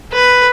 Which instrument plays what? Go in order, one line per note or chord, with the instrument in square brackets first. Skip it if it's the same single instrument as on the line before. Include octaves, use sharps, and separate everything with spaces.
[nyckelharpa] B4